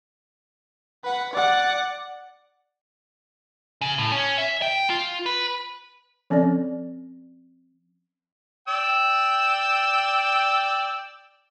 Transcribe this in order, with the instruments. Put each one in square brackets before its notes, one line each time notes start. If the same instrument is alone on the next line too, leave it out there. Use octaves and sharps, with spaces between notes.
[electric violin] B4 F#5
D5 F#5
[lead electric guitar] C#3
A2
C#4
E5
G5
F4
B4
[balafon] F3 C4 C#4 A4 D5
[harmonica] D5 G5 E6